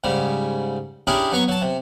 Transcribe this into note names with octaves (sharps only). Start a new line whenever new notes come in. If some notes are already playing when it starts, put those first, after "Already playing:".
G#2 C#3 G3
C#4 D4 E4 G4 G#4 A#4
F#3 B3 A#5 C#6
F#3 A5
C3